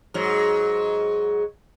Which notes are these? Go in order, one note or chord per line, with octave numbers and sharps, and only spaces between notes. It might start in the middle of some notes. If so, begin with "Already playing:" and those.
G#2 F#3